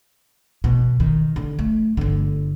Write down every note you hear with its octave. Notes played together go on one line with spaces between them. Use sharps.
B2
D#3
D3
A3
G1 D3